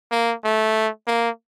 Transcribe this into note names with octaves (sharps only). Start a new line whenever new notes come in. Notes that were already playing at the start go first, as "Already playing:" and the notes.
A#3
A3
A#3